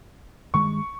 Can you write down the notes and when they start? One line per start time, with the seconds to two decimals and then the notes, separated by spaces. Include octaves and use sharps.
0.54 G2 D#3 G#3 C#6